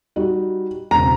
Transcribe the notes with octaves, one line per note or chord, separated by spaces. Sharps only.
G3 D#4 F#4
E1 C#3 C4 A#5